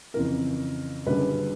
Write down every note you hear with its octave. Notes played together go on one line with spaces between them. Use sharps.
F2 C#3 E3 A#4
F#1 F#2 D3 G3 B4